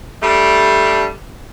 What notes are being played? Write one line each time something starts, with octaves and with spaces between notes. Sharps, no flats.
G3 A3 D4